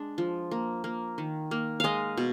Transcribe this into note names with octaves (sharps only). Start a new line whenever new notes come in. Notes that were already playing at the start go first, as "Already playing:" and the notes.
Already playing: G#3 D4
F3
A#3
A#3
D#3
A#3
G#3 D#5 F5
B2